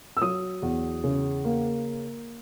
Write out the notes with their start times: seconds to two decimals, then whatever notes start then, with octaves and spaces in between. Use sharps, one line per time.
0.17 E6
0.21 F#3 D#6
0.62 E2
1.04 C#3
1.45 A#3